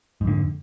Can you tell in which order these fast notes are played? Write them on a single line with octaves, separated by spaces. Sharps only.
G#2 F2 D3